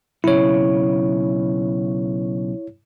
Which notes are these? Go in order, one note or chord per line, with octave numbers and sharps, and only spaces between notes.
B1 C#3 E4 C#5